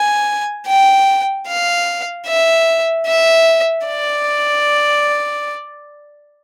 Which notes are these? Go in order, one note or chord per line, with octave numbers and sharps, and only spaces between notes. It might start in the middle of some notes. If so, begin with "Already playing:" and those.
Already playing: G#5
G5
F5
E5
E5
D5